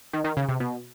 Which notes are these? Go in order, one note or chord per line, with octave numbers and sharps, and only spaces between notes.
D#3
D#3
C#3
C3
B2